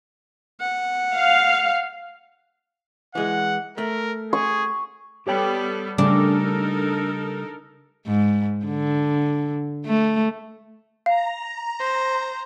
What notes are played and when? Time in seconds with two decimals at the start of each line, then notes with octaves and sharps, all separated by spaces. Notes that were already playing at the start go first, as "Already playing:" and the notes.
0.61 F#5
1.15 F5
3.15 E3 G#3 G#4 F#5
3.78 A3 A#4
4.33 G#4 C#6
5.27 G3 B3 G4 A4 C#5 G5
5.98 C#3 G3 A3 D4 D#4 A4 A#4
8.07 G#2
8.66 D3
9.86 A3
11.06 F5 A#5
11.79 C5